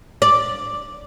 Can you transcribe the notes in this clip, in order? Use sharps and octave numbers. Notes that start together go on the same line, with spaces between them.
D5